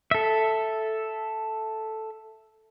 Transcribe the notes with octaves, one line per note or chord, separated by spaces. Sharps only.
A4 E5